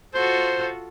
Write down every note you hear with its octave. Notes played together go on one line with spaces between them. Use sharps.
F4 F#4 A4 C5